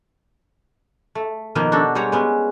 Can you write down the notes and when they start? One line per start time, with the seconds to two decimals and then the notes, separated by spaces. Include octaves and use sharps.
1.15 A3
1.55 B2 D#3 F3 A#3 B3
1.72 D4 F#4 G4 A4
1.95 G3 G#3 G4 C#5 F#5 A#5
2.12 G#3 B3 C#4